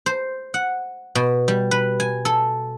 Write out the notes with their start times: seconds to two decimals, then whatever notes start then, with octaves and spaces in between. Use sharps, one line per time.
0.06 C5
0.54 F#5
1.15 B2
1.48 G3
1.71 B4
2.00 G#5
2.25 A4